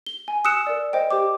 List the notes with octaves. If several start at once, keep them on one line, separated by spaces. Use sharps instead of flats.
G7
G#5
D#6 E6 F#6 C#7 E7
A#4 D5
C5 D#5 G5
G4 C5 D6